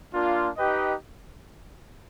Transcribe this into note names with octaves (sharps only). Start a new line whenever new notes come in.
A#3 D4 F4
D#4 G4 B4 D#5 G5